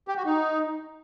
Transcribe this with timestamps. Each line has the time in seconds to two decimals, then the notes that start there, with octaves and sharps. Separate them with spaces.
0.08 G4
0.17 F#4
0.25 D#4